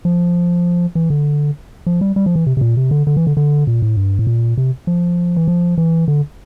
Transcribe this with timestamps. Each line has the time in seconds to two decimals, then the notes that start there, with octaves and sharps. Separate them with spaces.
0.05 F3
0.95 E3
1.10 D3
1.87 F3
2.01 G3
2.16 G3
2.26 F3
2.36 E3
2.47 C3
2.57 C3
2.61 A#2
2.77 C3
2.91 D3
3.07 D3
3.17 E3
3.27 D3
3.37 D3
3.67 A#2
3.82 A2
3.97 G2
4.19 A2
4.27 A#2
4.58 C3
4.87 F3
5.37 E3
5.48 F3
5.78 E3
6.08 D3